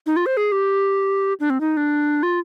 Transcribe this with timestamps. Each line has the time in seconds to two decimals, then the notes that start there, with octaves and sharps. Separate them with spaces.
0.06 D#4
0.16 F4
0.26 C5
0.37 G#4
0.52 G4
1.40 D4
1.50 C4
1.61 D#4
1.77 D4
2.23 F4